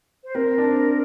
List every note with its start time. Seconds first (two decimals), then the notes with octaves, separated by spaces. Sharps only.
0.24 C5
0.35 C4 A#4
0.58 D4